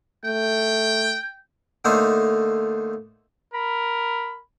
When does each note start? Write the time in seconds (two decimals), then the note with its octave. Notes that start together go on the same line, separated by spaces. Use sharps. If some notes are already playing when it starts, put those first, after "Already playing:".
0.25 A3 G5
1.85 D3 A3 A#3 D#4 C5 C#5
3.54 A#4 B5